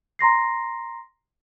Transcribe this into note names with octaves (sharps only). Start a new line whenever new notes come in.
A#5 C6 A#6 C7